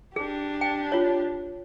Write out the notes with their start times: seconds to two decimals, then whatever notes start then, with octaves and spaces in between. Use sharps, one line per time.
0.16 D4 G4 G#4
0.61 G5
0.92 F4 C#5